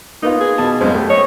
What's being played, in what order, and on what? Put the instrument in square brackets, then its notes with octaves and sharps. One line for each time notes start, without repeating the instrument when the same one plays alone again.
[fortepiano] A#3 B3 F4 [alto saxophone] D#4
[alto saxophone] G#4
[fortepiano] B2 A5
[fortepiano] B1 F2 G#2 [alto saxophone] C5
[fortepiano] A3 G4 E5
[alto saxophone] C#5 [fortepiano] D#5